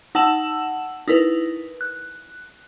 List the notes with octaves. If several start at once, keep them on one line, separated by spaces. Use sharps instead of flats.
D#4 F#5 A5 E6 E7 F#7
D#4 E4 A#4 B4
F#6